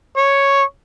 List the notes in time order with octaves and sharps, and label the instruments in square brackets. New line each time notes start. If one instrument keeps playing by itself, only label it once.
[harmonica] C#5